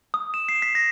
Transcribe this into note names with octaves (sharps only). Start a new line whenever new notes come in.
D#6
E7
C7
B6
A#6